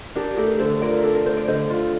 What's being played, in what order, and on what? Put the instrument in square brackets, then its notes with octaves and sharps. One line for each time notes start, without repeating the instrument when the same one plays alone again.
[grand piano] D4 [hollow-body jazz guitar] G4 A#4
[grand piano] A3 [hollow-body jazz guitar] G4 A#4
[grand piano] D3 [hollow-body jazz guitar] A4 C5
[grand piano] F4 [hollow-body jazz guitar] A#4 D5
[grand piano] D4 [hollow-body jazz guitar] A4
[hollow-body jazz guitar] A#4
[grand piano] A3 [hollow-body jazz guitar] C5
[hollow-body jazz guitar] D5
[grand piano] D3 [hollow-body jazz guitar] C5 D#5
[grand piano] F4